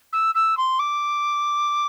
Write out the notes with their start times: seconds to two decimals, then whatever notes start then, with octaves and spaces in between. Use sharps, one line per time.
0.13 E6
0.35 E6
0.57 C6
0.79 D6